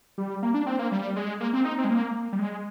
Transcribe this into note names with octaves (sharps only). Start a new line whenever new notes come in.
G3
A#3
D4
C4
A#3
G3
G#3
A#3
C4
D#4
C4
G#3
A#3
G3
G#3